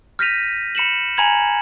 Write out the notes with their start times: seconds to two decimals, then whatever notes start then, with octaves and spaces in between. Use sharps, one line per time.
0.19 F6 G6 A#6 B6 D#7 F7
0.75 B5 C#7 E7 F#7
1.18 G#5 A#5 B5 G#6 F#7